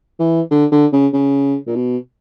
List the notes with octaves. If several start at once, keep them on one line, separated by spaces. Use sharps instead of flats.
E3
D3
D3
C#3
C#3
A#2
B2